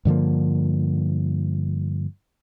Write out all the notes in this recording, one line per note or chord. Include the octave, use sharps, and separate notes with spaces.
G2 D3 F3 A#3